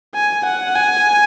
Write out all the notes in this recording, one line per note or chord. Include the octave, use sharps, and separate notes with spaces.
G#5
F#5
G#5